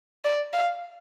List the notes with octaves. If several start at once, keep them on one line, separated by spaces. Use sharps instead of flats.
D5
F5